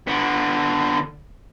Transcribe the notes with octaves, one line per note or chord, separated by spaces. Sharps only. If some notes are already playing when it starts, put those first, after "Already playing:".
D3 B3